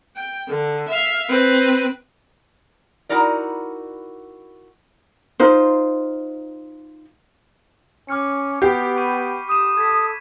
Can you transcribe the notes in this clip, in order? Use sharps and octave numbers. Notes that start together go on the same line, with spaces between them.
G5
D3
E5 F5
C4 B4
D#4 E4 F#4 A#4 D5
D#4 F4 C5
C#4 D6 F6 C#7
B3 G4 G6 B6 C7
B5 C#6 D#7
D#6 C7 D#7 E7
A4 G#6 B6